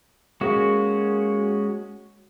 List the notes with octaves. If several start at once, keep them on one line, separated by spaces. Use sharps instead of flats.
G#3 A#3 C#4 F#4